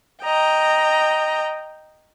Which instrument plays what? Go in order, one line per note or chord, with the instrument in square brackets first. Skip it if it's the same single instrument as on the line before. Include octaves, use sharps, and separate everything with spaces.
[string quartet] D#5 G5 A#5